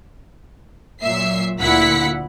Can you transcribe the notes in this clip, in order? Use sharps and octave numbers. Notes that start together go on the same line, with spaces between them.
A#2 F#3 E5 C7
D2 A#2 E4 F#5 B6 C#7